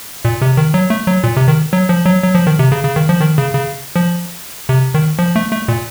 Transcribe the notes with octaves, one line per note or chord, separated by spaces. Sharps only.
A#2
C3
D#3
F#3
A3
F#3
A#2
C3
D#3
F#3
F3
F#3
F#3
F3
D#3
C3
C#3
C#3
D#3
F3
D#3
C#3
C#3
F3
C3
D#3
F3
A3
A3
A#2